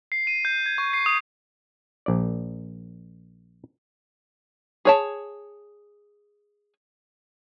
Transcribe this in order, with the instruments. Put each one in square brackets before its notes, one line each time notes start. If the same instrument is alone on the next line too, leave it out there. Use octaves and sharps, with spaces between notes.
[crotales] C7
D#7
G6
G#6
C#6
C7
D#6
[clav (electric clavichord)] A#1 D5
[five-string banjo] G#4 C#5 A5